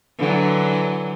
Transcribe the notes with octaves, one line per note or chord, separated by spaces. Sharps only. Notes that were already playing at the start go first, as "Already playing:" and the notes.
D3 E3 F#3